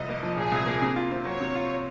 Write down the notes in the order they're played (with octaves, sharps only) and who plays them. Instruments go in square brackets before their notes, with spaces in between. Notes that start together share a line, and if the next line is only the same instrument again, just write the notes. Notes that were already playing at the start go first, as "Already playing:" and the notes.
Already playing: [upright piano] C2 F2 [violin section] D#5
[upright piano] A#3
F3
[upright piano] A#2 [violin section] G#4
[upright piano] C2
A#3
C3
F4
C4
[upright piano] F#3 [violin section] C#5
[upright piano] C3
F4